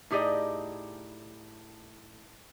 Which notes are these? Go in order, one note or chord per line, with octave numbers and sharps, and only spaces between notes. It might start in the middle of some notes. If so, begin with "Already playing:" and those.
A2 D#4 G4 G#4 D5 D#5